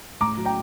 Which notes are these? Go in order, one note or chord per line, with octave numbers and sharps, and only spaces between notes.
A2 A#5 D6
F#3
G5 A#5